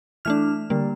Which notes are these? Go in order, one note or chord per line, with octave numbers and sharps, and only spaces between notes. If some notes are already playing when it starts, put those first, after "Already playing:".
E3 A3 D4 F6
D3 G3 A#3